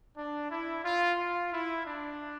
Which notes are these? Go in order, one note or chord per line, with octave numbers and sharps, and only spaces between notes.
D4
E4
F4
F4
E4
D4